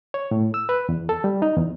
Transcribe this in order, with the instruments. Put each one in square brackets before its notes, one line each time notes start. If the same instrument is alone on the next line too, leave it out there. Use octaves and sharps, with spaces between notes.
[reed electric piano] C#5
A2
E6
B4
E2
A4
G3
D#4
E2